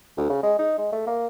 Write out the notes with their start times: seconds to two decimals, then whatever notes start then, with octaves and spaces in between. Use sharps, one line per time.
0.17 D2
0.30 C#3
0.43 G#3
0.59 D#4
0.78 G#3
0.92 A3
1.07 A#3